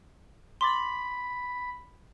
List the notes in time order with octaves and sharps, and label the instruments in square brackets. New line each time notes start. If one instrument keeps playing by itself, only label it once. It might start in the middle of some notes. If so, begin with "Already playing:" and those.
[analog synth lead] B5 [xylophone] C6 D6 A6